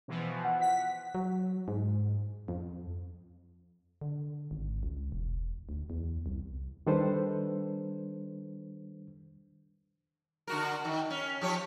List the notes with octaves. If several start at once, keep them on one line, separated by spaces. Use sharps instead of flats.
B2 E3 F3
F#5
B6
F#3
G#2
F2
D3
G#1
C#2
E1
D2
E2
C2
D#3 G3 D4 A4 B4 C5
D3 F#4 A#4
D#3
C#4
F3 G4 C#5